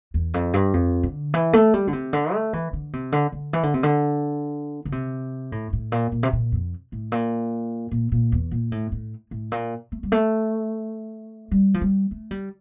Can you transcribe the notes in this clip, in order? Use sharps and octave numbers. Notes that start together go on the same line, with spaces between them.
E2
F2
G2
F2
D3
E3
A3
G3
D3
C3
D3
A3
E3
D3
C3
D3
D3
E3
D3
C3
D3
D3
C3
A2
A2
A#2
A#2
C3
A#2
F2
A2
A#2
A#2
A#2
E2
A#2
A2
A2
A2
A#2
A3
G3
A3
G3
F3
G3
A3
G3